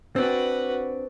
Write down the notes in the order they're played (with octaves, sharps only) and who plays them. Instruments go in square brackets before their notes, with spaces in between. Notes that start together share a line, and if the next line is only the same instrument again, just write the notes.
[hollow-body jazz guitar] C4 D4 [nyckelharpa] F#4 B4